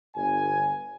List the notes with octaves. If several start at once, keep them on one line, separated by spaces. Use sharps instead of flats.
G1 G#5